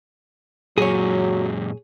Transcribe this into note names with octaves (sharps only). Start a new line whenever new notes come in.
F#2 A#2 F#3 G#4 C#5